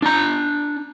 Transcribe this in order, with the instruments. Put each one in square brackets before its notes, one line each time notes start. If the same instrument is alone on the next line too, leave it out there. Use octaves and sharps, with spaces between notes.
[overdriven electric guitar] D4 A#5